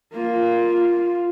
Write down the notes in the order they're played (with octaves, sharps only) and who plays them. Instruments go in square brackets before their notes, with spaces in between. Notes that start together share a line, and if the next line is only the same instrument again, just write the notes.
[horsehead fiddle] A#3 F4
F4